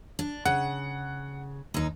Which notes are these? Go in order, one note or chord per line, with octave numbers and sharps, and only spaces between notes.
D4
C#3 F#5
D#2 D#4